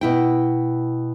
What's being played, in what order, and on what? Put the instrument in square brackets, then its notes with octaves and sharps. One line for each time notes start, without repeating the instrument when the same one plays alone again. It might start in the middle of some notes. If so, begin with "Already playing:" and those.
[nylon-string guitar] B2 E4 G5